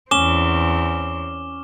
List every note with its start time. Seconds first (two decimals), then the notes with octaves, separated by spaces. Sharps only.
0.11 E2 C4 C#4 D6 E7 G7